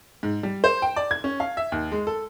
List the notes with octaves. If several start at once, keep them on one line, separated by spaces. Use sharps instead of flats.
G#2
G3
C5
G5
D5
G#6
C#4
F5
E5
D#2
G#3
A4